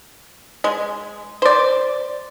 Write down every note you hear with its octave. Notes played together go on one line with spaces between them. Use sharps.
G#3
C5 D5